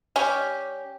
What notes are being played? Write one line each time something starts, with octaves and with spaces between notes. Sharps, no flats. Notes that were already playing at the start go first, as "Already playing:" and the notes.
G3 C#4 G4